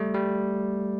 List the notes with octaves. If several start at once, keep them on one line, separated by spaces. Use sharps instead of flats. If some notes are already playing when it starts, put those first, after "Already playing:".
Already playing: G3 A3
G3